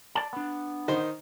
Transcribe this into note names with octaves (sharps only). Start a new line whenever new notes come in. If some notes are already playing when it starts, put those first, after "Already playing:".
D5 A5
B3 D4
D#3 D#4 C5